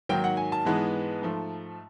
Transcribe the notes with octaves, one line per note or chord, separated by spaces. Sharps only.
G#2 D#3 F#3 A#3 G5
F#5
G#5
A5
G#2 E3 G#3 B3
G#2 F3 A3